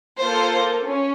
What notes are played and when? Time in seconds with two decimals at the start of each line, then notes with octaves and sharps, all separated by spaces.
0.21 A#3 F4 A4 C5
0.84 C#4